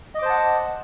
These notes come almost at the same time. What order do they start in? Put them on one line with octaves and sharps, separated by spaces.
D#5 D6 C5 A5 F#5